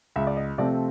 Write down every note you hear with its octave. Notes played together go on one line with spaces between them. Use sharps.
C#2 E5
D5
D#5
C3 F3 A3 C4 D5